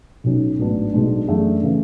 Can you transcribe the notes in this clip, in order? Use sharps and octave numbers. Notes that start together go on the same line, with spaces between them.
B1 B2 F#3 C#4
A1 G#2 F#3 B3 D4
B1 B2 G#3 D4
F#2 E3 A3 D4 G#4
C#3 E3 A3